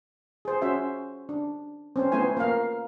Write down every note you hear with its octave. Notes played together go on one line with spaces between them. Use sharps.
G#4 C5
C#4 F#4 C5 E5
D4
C4 C#4 C5
A3 B3 C4 E4 C5 G#5
A#3 B3 A#4 F5